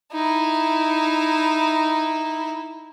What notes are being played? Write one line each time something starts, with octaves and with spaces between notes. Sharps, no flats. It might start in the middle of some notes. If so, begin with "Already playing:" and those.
D#4 E4